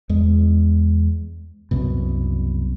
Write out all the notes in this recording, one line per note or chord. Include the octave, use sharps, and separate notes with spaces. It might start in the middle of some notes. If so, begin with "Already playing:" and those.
E2 G#3
C2 F#2 B2